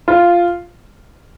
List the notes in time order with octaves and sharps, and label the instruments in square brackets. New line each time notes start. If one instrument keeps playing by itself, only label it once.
[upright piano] F4